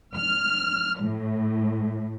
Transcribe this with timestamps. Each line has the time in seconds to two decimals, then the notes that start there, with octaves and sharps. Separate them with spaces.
0.16 F6
1.02 A2